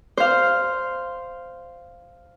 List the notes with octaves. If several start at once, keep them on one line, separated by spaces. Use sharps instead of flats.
C5 F5